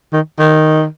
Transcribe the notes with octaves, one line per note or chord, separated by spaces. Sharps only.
D#3
D#3